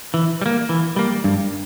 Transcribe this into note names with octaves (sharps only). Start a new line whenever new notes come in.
E3
G3
A#3
E3
G3 A#3
G2